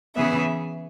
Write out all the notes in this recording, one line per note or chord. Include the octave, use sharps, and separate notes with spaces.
C#3 E3 B3 G#4 E5